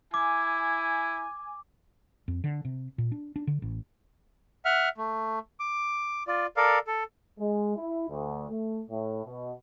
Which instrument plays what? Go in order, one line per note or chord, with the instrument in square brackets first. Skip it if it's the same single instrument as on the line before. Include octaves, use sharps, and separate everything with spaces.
[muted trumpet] E4 [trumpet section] G#5 [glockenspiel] D6
[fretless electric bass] F2
D3
C3
A#2
D4
D4
D3
A1
[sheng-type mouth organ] E5 F#5 F6
A3
D6
F4 D5
A4 A#4 D5 F5
A4
[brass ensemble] G#3
E4
D2
A3
A2
B2